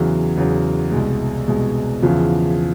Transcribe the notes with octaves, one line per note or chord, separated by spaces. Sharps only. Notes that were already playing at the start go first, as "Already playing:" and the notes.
Already playing: E2 C#3 F#3
E2 C#3 F#3
C2 B2 G#3
C2 B2 G#3
E2 C#3 F3